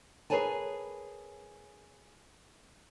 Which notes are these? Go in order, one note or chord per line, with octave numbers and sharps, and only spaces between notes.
G#4 A#4 B4 C#5 G#5 A5